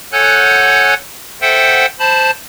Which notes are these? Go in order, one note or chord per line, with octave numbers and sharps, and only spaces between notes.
A4 C#5 F#5 G#5 F#6 G6
A4 C5 E5 F#5 G5
C5 A5 B5